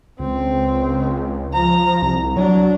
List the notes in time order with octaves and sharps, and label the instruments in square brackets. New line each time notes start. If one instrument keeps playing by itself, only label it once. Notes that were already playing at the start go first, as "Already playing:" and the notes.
[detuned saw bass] C#2 [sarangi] C4
[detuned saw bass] F3 [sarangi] A#5
[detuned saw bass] C2
[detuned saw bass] F#3 [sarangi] D4